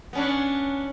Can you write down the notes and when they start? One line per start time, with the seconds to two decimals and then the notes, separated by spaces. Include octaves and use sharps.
0.13 B3 C#4 D4